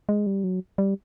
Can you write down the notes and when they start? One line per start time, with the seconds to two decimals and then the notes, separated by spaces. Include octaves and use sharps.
0.09 G#3
0.27 G3
0.44 F#3
0.78 G3